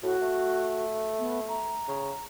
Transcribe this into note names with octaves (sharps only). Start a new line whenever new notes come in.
A2 F#4
A3
B3
A#5
C#3